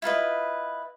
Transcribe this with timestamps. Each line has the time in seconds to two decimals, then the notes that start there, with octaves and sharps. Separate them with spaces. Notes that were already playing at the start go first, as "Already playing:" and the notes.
0.02 E4 F4 B4 D#5